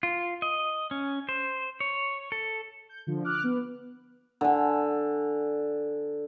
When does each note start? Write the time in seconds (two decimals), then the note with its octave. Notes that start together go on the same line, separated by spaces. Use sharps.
0.03 F4
0.42 D#5
0.91 C#4
1.29 C5
1.80 C#5
2.32 A4
2.89 G6
3.07 D3 F3
3.24 D6 F6 F#6
3.44 B3
4.41 D3 G#5